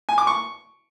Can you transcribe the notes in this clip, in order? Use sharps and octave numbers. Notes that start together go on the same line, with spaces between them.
G#5
D6
C#6